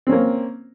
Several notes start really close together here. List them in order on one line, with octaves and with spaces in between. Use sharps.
C4 C#4 A#3